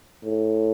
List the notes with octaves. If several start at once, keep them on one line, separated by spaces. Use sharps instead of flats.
A2